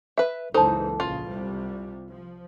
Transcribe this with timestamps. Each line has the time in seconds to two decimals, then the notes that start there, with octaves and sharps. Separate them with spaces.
0.18 B4 E5
0.54 F#1 C#2 E3 D#4 A4 C5 A5
1.00 A#1 C#3 F4
1.29 C2 C3 G3
2.09 F3